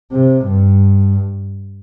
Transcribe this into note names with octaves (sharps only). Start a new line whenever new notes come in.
C3
G2